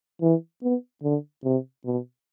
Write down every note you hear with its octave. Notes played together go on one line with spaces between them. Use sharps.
E3
B3
D3
C3
B2